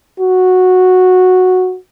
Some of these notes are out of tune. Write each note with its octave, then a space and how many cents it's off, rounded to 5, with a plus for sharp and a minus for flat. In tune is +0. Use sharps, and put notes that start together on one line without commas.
F#4 -10